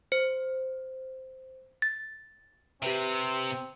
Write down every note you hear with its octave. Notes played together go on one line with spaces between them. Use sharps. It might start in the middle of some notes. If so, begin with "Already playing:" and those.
C5
A6
C3 C4 G4 B4 E5